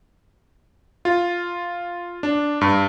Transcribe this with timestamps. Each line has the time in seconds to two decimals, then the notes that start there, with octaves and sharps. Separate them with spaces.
1.05 F4
2.23 D4
2.61 G2